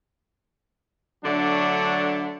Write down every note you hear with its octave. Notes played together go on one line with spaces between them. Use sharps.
D3 F#3 A3 D4